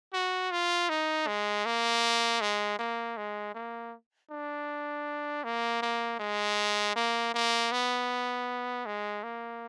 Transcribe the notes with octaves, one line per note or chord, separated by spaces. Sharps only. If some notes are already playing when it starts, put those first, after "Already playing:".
F#4
F4
D#4
G#3
A#3
G#3
A#3
G#3
A#3
D4
A#3
A#3
G#3
A#3
A#3
B3
G#3
A#3